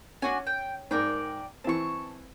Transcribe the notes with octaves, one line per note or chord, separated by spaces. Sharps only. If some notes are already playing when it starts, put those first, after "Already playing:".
C#4 D4 F#4 G#5
G5
G#2 A#4 D5 G5
E3 C4 A5 C#6